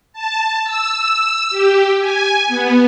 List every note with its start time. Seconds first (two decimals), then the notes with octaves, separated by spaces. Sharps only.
0.13 A5
0.64 E6
1.50 G4
2.00 G#5
2.47 B3